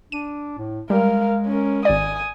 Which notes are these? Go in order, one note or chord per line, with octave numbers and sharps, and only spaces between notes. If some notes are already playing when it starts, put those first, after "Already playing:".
D4 D#7
A2
G3 G#3 A#4 F5
C#4 A#4
G#1 D5 G#5 D#6